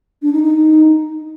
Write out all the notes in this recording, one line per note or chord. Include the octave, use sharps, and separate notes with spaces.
D4
D#4
D#4